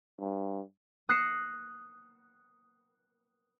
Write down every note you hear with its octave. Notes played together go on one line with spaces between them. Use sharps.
G2
D#6 F#6 A#6 C7 C#7 E7